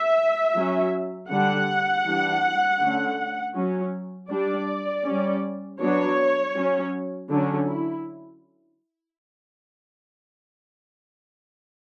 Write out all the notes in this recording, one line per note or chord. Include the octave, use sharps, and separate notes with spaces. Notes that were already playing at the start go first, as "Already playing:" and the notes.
Already playing: E5
F#3 C#4
D3 G3 D4 F#5
E3 G3 D4
D3 A3 C#4
F#3 C#4
G3 D4 D5
G3 C#4
F#3 B3 D4 C#5
F#3 C#4
D3 F#3 C#4 D4
E4